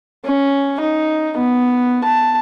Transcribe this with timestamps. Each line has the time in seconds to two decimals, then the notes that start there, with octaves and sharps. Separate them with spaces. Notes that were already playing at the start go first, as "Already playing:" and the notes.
0.24 C#4
0.81 D#4
1.37 B3
2.04 A5